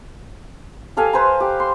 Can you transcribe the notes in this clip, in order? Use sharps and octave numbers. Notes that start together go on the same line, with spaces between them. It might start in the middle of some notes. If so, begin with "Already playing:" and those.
G4 A4 F5 G#5
B4 C5 G#5 A#5
G4
C6